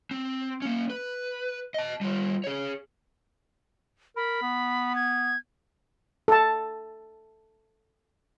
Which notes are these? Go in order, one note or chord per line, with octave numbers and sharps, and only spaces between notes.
C4
A#3 C#4
B4
D#5 A5
G3 F4
G#4 C#5
A#4 B5
B3
G#6
A4 A5